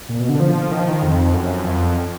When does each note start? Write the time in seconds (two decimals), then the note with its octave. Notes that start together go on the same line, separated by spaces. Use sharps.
0.09 A#2
0.20 B2
0.29 D3
0.40 F3
0.71 D#3
0.79 F3
0.88 D#3
1.03 F2
1.33 F#2
1.64 F2